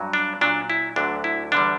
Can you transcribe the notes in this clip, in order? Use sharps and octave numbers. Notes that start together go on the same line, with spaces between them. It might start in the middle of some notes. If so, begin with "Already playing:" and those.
Already playing: G2 F#3
D4
A#2 F#3 D4
E4
D2 D3 F#3 D4
E4
E2 D3 G3 D4